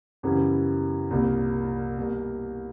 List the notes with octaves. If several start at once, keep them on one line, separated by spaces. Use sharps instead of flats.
F#2 C#3 E3 G3 B3
C2 A#2 G3 A#3
B2 G3 A#3